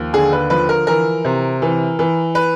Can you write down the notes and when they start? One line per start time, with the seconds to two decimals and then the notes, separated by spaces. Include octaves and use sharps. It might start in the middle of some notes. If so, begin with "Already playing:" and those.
Already playing: D#2 F3
0.13 D3 G#4
0.32 B4
0.50 F3 B4
0.69 A#4
0.87 E3 A#4
1.25 C3
1.62 E3
1.99 E3
2.35 B4